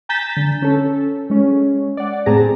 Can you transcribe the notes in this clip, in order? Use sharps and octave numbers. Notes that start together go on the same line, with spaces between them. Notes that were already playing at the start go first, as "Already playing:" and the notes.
G#5 A#5 G6 A6 B6 E7
D3
C#4 A4
G#3 C#4
D5 F#5
A2 C4 G#4 A5 A#5